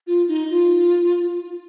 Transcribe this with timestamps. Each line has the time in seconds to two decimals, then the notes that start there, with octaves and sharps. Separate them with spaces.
0.07 F4
0.28 D#4
0.50 F4